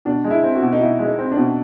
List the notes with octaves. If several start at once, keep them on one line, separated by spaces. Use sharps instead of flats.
B2 D4
G#3
E4
C4
F#4
B2
D#4
B2 E4
G#3
D#4
C4
D4
B2